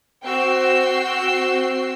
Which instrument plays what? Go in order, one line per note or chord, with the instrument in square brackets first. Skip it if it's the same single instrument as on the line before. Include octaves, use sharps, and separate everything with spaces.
[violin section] C4 F#4 G5 E6 C7